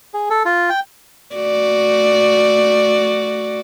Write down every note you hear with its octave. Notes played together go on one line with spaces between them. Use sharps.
G#4
A4
F4
G5
A3 F#4 D5